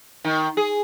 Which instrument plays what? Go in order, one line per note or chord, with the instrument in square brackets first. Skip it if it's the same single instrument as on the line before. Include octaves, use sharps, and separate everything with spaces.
[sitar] D#3
G#4